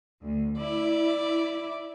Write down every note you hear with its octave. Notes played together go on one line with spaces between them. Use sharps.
D2
E4 D5 E5